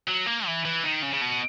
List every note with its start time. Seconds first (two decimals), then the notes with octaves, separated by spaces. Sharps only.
0.08 F#3
0.27 A#3
0.46 E3
0.65 E3
0.84 D#3
1.02 C#3
1.13 C#3
1.21 B2